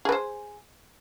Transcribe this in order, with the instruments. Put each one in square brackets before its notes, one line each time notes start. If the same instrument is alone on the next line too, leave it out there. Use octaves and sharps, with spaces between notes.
[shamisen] G#4
B4
C5